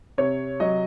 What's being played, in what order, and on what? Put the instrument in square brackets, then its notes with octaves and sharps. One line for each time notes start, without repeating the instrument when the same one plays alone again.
[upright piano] C3 C#5
F#3 D#5